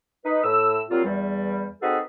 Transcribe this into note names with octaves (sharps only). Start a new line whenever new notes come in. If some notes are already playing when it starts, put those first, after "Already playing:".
D#4 B4
A2 E6
F#3 G3 A#3 C4 F4
E2 G3
C4 D#4 F#4 G#4 A4 B4